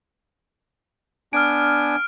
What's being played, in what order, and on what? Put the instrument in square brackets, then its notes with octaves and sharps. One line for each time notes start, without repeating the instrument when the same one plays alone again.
[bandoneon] B3 D4 G#5 [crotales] F6 D7